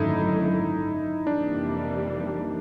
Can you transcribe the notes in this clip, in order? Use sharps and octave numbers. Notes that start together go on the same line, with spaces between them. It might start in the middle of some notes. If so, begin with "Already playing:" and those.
Already playing: G#1 F#2 D3 F#3 A3 D#4 E4
F2 C3 E3 G3 A#3 D4